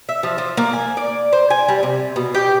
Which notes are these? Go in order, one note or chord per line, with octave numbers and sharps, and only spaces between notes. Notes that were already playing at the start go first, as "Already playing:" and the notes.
E5
F3
F3
A#3
G#5
D5
C5
G#5
G3
C3
B2
G4